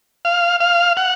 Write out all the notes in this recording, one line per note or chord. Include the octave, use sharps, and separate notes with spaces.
F5
F5
F#5